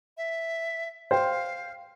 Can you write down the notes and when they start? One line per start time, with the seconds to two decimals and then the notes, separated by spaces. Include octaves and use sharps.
0.17 E5
1.11 C5 F5 G5